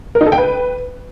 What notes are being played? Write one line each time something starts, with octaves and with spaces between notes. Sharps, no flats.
A#4
D#4
A4
G5
B4